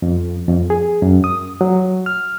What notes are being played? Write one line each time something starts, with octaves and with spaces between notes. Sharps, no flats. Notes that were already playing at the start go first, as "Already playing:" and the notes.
F2
F2
G#4
F#2
D#6
F#3
F6